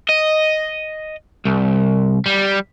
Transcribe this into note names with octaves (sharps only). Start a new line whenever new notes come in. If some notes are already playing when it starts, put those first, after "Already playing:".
D#5
C2
G3